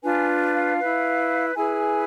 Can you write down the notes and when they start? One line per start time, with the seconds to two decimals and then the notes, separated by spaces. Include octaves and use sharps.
0.03 D4 F4 B4 G#5
0.54 F5
0.79 E4 B4
1.55 E4 G#4 B4 G#5